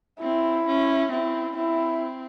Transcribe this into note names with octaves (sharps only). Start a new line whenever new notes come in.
C4 E4
C#4
C4 E4
C4 E4